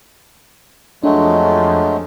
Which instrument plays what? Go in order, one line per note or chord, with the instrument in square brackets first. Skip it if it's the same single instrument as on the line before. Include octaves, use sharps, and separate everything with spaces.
[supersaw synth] F2 F3 [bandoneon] F#3 G#3 A3 [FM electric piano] D4